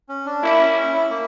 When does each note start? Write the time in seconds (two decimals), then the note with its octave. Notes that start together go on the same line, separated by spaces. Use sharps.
0.09 C#4
0.26 D4
0.43 A#3 E4
0.60 C#4
0.76 C#4
0.93 E4
1.10 A#3